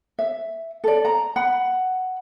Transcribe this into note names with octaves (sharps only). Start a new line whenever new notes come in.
E5
A4 D5
A#5
F#5 B5